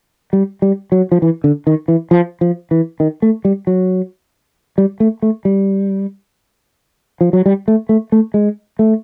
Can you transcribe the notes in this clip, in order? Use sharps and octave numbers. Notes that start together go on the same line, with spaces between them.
G3
G3
F#3
F3
E3
D3
D#3
E3
F3
F3
E3
D#3
A3
G3
F#3
G3
A3
A3
G3
F3
F#3
G3
A3
A3
A3
G#3
A3